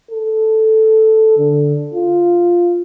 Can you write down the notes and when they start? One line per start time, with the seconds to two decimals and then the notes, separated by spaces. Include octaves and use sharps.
0.11 A4
1.38 D3
1.94 F4